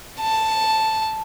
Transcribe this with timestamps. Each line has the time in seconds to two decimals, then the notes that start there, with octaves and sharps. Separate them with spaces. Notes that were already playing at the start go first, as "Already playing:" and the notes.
0.20 A5